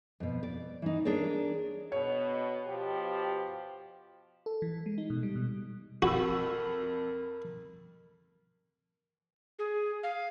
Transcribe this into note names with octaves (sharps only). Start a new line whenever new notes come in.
F2 B2
D5
E3 D#4
D4 G#4 A#4 C#5 D5
B2 C#5
B2 F3 G4
A4
E3
G#3
D#4
B2
G3
B2
F2 F#4 A#4 B5 E6
G#4
F5